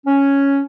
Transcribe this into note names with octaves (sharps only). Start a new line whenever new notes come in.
C#4